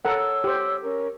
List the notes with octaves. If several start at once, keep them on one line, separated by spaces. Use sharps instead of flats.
A4 A#4 C#5 F#5 E6
G4 C5
C#4 A#4